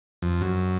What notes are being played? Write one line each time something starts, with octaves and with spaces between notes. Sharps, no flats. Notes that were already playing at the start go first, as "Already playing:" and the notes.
F2
F#2